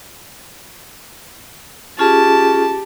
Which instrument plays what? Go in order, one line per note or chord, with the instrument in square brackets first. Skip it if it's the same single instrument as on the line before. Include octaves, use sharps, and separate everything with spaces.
[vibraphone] C#4 F4 G#4 [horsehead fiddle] G4 [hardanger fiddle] A5